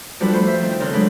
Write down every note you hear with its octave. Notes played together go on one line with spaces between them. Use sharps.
F3 G3 D4 F#4 A4 B4
A3 C5 B5
E5
D#3 C4
C#3 A4 A#4 C6 F#6
F#3 G#3 C4 D4 B4